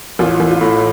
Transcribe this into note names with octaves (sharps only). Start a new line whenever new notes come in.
A1 F4
A1
F4
A2